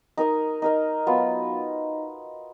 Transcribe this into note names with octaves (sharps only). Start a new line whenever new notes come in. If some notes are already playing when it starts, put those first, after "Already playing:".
D#4 A#4 D#5
D#4 A#4 D#5
F#3 B3 F4